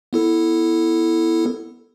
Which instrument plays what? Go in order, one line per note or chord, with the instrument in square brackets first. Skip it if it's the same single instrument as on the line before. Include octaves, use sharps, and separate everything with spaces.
[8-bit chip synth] B3 E4 A4